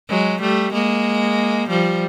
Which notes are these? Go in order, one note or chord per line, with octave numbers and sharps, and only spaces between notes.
F#3 G#3
G3 A3
G#3 A#3
F3 G3